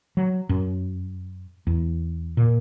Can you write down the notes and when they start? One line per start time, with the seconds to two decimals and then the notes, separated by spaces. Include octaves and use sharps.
0.17 F#3
0.49 F#2
1.67 E2
2.37 A#2